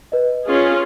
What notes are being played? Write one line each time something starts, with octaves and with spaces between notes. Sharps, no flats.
B4 D#5
C#4 F4 G#4